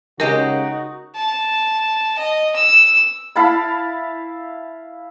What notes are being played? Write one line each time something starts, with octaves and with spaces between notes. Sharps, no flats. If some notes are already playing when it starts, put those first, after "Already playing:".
C#3 G#3 D#4 F#4 G4 A#4 D#5
A5
D#5
E6
E4 F5 A5 B5